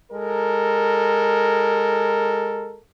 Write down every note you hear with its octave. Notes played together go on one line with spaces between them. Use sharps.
G#3 A4 A#4